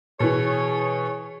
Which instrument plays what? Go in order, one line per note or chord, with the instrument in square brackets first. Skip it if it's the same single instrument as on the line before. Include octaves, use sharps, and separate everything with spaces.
[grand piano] B2 E3 [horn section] G#4 C#5